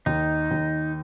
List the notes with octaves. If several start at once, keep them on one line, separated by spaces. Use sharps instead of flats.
D#2 D#4
D#2